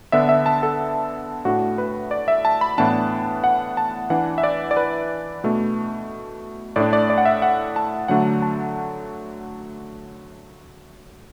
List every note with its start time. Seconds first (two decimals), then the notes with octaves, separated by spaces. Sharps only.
0.12 D3 B3 D4 E5
0.29 E5
0.46 A5
0.63 A4
1.45 A2 A3 D4 F#4
1.78 B4
2.11 D5
2.28 E5
2.45 A5
2.61 B5
2.78 A2 E3 B3 D4 A5
3.44 F#5
3.77 A5
4.10 E3 D4 F#5
4.38 E5
4.43 D5
4.71 D5
4.77 B4
5.44 B2 A3 D4
6.76 A2 A3 D4 D5
6.93 D5
7.10 D5
7.18 F#5
7.25 E5
7.42 F#5
7.76 A5
8.08 D3 F#3 A3 D4 F#5
8.42 A5